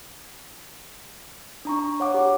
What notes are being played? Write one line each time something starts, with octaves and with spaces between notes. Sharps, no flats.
D4 A#5 C#6
C#5 F#5 D6
G4